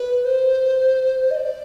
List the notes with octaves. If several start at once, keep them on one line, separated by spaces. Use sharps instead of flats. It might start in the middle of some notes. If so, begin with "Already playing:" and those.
Already playing: B4
C5
D#5
D5